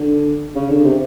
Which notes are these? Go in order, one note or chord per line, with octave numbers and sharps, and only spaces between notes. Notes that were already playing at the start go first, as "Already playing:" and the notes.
Already playing: D3
C#3
D3
C3